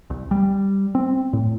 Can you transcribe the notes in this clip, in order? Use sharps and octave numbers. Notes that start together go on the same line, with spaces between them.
C2
G3
C4
A2